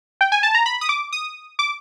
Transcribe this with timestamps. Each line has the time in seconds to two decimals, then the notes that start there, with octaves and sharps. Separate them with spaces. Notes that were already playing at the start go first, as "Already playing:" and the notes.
0.21 G5
0.32 G#5
0.43 A5
0.55 A#5
0.66 B5
0.81 D#6
0.89 D6
1.13 D#6
1.59 D6